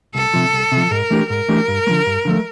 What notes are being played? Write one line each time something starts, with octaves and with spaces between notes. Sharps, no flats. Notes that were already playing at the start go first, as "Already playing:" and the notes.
C2 A4
C3 F3
C2
C3 F3
G#2 A#4
E3 A3 D4 G4
G#2 A#4
E3 A3 D4 G4
G2
D3 F3 A3
G2
D3 F3 A3